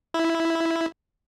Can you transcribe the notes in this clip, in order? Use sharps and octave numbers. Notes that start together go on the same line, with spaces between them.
E4